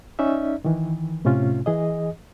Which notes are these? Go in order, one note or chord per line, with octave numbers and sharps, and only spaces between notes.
C#4 D#4 D5 E5
D#3 E3
A2 C3 A3 C#4 F4
E3 G#4 D#5